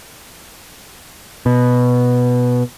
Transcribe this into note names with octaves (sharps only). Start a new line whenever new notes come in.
B2